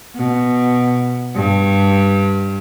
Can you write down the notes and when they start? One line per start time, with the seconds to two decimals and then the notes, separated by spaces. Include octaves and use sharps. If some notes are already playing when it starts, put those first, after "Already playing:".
0.15 B2
1.36 G2